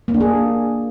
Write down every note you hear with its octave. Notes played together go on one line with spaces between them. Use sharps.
A#3
D4
G#4